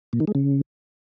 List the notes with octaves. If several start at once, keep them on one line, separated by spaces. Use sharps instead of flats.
A#2
D#3
G#3
C#3